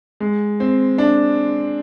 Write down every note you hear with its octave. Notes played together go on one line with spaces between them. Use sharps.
G#3
C4
D4